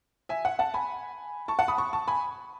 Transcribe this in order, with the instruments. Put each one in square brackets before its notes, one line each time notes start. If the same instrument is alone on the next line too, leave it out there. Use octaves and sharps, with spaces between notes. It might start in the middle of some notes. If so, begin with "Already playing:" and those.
[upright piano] E5 G#5
F#5
F#5 A5
G#5 B5
A5 C#6
F#5 A5
B5 D#6
A5 C#6
A5 C#6
G#5 B5